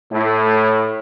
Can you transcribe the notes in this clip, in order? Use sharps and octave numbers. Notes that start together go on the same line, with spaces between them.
A2